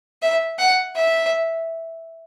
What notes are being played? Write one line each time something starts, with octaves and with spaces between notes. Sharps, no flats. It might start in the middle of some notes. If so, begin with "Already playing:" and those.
E5
F#5
E5